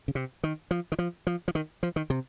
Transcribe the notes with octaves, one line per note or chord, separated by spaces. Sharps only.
C#3
C3
D#3
F3
D#3
F3
F3
F3
D#3
F3
D#3
C3